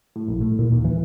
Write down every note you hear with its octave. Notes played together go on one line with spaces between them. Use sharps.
A2
A#1
A2
A#2
D#2
E3